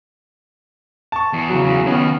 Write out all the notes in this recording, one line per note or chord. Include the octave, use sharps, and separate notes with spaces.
A5 C#6
E2
C#3 F#3
E2
D#3 B3 C#4 F5